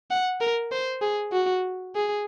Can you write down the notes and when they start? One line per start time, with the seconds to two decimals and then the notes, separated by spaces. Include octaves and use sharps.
0.11 F#5
0.41 A#4
0.72 C5
1.02 G#4
1.33 F#4
1.95 G#4